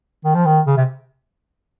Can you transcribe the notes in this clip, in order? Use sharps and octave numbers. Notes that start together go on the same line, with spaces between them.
D#3
F3
D#3
C#3
C3